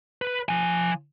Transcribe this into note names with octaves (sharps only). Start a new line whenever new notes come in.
B4
F3 G#5